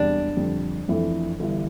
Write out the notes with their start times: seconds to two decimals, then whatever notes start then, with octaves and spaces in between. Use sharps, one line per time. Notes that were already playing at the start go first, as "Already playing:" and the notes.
Already playing: E1 E2 C3 G3 D4
0.37 F2 D3 G3
0.88 F2 E3 A3
1.40 G1 G2 E3